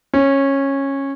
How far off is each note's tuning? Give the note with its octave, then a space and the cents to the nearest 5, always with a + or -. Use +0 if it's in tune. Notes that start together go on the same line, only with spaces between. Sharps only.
C#4 -15